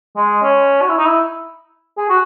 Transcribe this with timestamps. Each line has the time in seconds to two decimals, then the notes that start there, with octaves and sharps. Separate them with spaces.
0.16 G#3
0.43 C#4
0.81 F#4
0.89 E4
0.97 D#4
1.05 E4
1.98 G#4
2.09 F#4